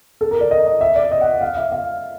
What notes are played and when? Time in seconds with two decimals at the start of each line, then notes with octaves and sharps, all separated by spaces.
0.21 A4
0.31 A#4
0.41 D5
0.51 D#5
0.67 D#5
0.81 E5
0.96 D5
1.11 D#5
1.21 F#5
1.41 F5
1.57 E5
1.72 F5